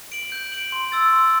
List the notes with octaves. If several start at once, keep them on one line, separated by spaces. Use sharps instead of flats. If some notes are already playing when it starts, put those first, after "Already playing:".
D7 F#7
G6
D7 F#7
C6
E6 A6
C6